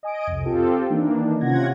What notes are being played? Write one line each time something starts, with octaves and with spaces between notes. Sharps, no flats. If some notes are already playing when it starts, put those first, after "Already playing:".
D#5 G#5 D#6 D7
C2 F2
C4 F4 G4 A4
D#3 E3 A#3 D4 D#4
C3 C#4 F4 F#5 G#6 A#6